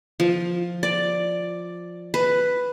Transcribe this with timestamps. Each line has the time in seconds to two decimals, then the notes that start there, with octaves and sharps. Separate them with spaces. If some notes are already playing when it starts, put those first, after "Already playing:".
0.20 F3
0.83 D5
2.14 B4